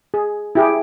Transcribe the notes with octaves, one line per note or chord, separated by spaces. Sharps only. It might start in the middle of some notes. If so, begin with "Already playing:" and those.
G#4
E4 G4 G#4